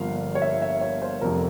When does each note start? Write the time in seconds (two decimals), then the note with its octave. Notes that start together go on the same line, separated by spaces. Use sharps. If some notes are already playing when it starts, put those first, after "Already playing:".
Already playing: G1 G2 F3 A#3 F5
0.35 C#5
0.42 E5
0.62 E5
0.81 C#5
1.02 C5
1.21 F1 F2 C3 A#4